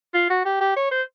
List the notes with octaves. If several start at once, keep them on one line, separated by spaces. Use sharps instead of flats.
F4
F#4
G4
G4
C#5
C5